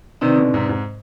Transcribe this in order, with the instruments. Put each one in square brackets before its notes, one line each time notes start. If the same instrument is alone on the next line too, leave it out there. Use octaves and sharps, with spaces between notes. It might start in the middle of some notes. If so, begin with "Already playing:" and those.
[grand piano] C3 D#3 [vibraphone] C4 D#4 B4 D5
[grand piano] B2 D3
G#2 C3
G#2